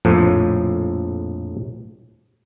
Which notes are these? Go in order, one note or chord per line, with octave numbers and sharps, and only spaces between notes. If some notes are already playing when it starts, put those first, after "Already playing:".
A#1 F2 A2 F3